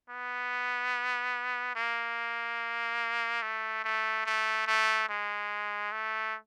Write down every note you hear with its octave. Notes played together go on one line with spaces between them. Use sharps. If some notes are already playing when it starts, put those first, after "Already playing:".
B3
A#3
A3
A3
A3
A3
G#3
A3